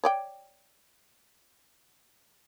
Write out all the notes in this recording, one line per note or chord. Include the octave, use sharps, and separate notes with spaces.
C#5 D5 G5